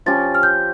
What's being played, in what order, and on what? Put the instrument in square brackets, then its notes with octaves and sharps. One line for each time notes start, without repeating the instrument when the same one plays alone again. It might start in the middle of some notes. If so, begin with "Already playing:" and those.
[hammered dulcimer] F3 C#4 G4 [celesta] A6
[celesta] F6
G6